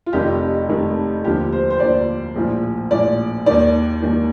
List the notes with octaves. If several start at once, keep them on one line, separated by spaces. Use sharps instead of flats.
F4
F1 F2 D#3 G4
F1 F2 D#3
D#2 D3 F3 G4
C5
C5
D#2 D3 F3 D5
A#1 A2 F3
A#1 A2 F3 D5
D#2 D#3 D5
D#2 D#3